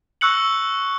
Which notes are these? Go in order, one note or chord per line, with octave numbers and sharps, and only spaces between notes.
C#6 E6 F#6 C#7 F#7